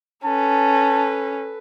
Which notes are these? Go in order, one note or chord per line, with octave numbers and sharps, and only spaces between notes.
C#4 A4 B4 A5